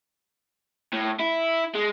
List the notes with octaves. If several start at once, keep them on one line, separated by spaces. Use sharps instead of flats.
A2
E4
G#3